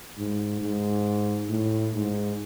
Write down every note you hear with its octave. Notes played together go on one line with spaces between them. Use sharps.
G#2
G#2
A2
G#2